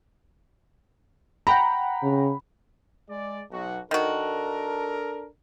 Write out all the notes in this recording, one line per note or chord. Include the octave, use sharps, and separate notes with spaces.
F#5 G5 A#5 B5
C#3
G#3 D5
B1 F#4
D#3 D4 F#4 A4 A#4